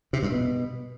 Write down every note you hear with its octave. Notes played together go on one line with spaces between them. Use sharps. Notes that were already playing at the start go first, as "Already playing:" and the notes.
C3
G2
B2